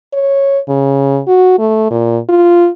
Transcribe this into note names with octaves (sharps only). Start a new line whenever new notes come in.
C#5
C#3
F#4
A3
A#2
F4